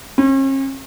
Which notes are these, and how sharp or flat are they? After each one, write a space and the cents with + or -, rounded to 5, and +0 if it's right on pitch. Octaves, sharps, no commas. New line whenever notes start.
C#4 -45